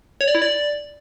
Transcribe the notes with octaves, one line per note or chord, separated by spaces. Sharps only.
C#5
D5
E4
D5